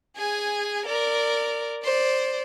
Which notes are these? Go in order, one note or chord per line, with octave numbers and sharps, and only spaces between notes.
G#4 G#5
A#4 D5
C5 D5